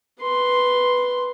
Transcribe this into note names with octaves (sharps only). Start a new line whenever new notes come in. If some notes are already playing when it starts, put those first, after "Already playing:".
B4 C6